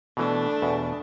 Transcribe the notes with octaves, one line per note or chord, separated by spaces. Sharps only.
B2 E3 A3 D4
E2 B2